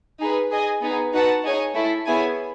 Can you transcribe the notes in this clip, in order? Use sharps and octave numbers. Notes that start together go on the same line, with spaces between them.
D#4 G#4 B4
G#4 D#5 G#5
B3 D#4 G#4
D#4 F#4 B4 F#5 A5
D#4 G#4 C#5 G#5
A3 E4 A4
B3 E4 G#4 C#5 G#5